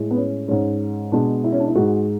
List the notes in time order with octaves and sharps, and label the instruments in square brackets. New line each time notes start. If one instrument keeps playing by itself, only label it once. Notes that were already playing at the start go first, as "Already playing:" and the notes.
Already playing: [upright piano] A2 G#3
B3
C#4
G#2 G#3 C#4
B2 G#3 D4
E4
C#4
D4
E4
G#2 G#3 F#4